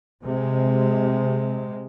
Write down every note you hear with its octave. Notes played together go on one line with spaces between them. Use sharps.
C3 G#3